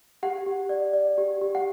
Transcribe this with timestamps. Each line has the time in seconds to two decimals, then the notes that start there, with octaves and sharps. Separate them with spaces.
0.23 G4 F#5
0.47 G4
0.69 D5
0.93 D5
1.18 G4
1.41 G4
1.55 F#5